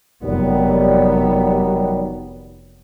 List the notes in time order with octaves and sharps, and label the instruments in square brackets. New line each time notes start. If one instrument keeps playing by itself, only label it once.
[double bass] F1 B3 [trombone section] D#3 F#3 G3